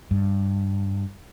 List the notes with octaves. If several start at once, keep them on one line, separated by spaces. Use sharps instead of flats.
G2